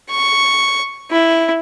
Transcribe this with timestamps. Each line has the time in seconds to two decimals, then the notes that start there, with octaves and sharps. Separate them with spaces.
0.11 C#6
1.11 E4